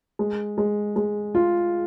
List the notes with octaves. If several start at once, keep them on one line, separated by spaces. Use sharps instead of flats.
G#3
G#3
G#3
F4